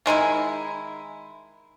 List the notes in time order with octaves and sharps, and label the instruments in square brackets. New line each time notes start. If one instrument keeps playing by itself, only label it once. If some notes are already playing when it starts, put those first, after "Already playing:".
[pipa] D#3 G#3 D#4 E4